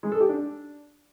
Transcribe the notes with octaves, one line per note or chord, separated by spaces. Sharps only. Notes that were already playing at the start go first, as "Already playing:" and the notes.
G#3
A4
G4
D4